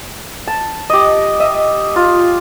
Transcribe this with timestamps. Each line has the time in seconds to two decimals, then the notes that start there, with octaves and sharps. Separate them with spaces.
0.47 A5
0.90 G4 D#5
1.40 D#5 E5
1.96 F4